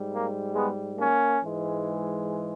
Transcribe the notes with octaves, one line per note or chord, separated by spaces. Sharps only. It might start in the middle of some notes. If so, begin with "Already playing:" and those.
Already playing: G#2 G3
A#3
G#3 B3
A#3 C#4
G#2 E3 G#3